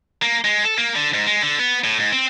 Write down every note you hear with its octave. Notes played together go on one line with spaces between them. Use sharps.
A#3
G#3
A4
A#3
D3
G#2
G#3
D3
B3
A2
G#2
C4